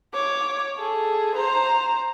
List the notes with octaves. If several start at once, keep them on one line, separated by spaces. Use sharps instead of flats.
C#5 D6
G#4 A4
C5 A#5